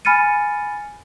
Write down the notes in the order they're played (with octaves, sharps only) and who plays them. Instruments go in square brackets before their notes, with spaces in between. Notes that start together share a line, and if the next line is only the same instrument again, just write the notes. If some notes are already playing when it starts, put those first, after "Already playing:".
[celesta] G#5 B5 F6 A6 C#7 D#7